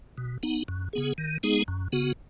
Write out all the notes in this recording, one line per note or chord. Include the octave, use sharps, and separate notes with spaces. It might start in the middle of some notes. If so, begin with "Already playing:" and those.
B2
B3 D#4
F#2
C#3 B3 G#4
D#3
G#3 B3 D#4 G#4
F#2
C#3 B3 F#4